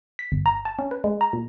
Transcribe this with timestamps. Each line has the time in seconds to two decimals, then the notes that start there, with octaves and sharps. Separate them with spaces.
0.19 B6
0.32 G1
0.46 A#5
0.65 A5
0.79 C#4
0.91 B4
1.04 G#3
1.21 A#5
1.33 A#2